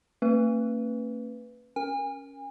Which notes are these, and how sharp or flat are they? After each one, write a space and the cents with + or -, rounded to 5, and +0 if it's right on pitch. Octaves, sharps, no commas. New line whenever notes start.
A#3 -45 C#4 -35 B4 +0
C#4 +0 A#4 +15 G#5 -35